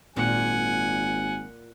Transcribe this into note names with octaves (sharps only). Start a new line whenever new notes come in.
G#1 A#2 F#5 G#5